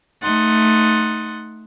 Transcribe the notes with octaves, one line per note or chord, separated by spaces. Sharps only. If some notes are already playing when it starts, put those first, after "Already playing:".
A3 D#4 F#5 C6 A6